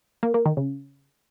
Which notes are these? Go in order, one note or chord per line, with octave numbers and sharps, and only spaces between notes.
A#3
A#3
D#3
C#3